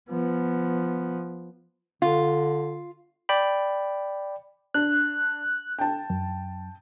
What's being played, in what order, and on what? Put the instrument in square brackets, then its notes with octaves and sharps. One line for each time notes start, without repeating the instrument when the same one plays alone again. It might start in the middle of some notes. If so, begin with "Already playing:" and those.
[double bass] F3 B3
[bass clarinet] D3 [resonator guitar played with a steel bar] F4
[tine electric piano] D5 G5 B5
[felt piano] D4 [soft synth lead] F#6
[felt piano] G5 A5
[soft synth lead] F#2